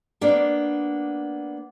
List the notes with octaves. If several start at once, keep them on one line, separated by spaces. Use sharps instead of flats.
A#3 B3 D4